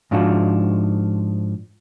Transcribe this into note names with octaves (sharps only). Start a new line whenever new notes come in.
G#2 F3 D4 F4 F#4